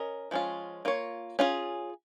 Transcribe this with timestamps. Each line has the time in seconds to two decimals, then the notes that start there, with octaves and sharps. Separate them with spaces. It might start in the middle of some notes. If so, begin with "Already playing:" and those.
Already playing: C#4 A#4 D#5
0.31 F3 G#3 C#4 F4
0.85 A#3 F4 C#5
1.39 C#4 F4 G#4